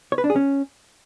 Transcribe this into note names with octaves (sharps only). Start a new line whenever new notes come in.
C#5
B4
D4
G#4
C#4